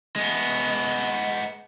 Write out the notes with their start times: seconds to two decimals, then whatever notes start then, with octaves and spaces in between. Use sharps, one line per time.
0.16 G#3 B3